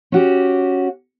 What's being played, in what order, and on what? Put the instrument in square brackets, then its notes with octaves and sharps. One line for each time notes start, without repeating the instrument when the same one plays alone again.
[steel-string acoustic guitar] C#4 F#4 G4